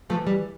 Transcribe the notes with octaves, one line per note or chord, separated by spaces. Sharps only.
E3 F3 A3
G3